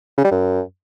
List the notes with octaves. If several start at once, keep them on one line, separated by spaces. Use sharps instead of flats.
C#3
G3
F#2